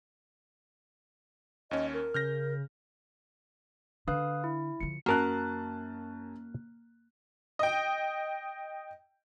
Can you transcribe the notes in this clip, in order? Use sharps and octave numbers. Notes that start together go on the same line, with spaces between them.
D#2 C#4 D#5
A#4
C#3 F6 G6 A#6
D3 B4 F5 D#6
E4
D3 F3 C#7
F#2 A#3 F#4 A#4 A5 F#6
D#5 G5